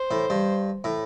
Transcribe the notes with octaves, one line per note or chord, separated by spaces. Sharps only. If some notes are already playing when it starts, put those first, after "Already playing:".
Already playing: C5
A2
G2
A2